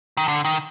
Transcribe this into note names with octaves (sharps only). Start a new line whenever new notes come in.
D#3
D3
D#3